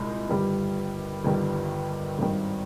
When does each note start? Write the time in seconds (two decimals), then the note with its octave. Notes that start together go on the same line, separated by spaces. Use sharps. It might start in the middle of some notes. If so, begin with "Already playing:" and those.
Already playing: C2 A#2 G#3 D#4
0.29 G1 G2 D#3 G3
1.24 G1 G2 D#3 G3
2.19 G#1 G2 D#3